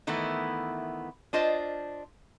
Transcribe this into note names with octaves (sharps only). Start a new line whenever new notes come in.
D#3 E3 A3 B3 E4
D4 F4 C5 D#5